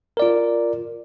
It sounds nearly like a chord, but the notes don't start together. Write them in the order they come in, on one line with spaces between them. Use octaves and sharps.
A#4 D5 F4